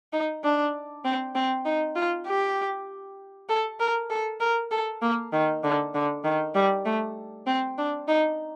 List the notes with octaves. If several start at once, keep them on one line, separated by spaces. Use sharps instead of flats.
D#4
D4
C4
C4
D#4
F4
G4
A4
A#4
A4
A#4
A4
A#3
D#3
D3
D3
D#3
G3
A3
C4
D4
D#4